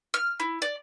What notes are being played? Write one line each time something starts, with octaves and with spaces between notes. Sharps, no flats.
F6
E4
D5